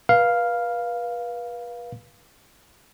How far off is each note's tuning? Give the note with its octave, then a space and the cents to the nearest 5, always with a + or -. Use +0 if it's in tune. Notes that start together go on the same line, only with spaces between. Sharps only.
B4 -35 F5 +0